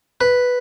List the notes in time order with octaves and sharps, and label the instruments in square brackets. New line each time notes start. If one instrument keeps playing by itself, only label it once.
[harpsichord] B4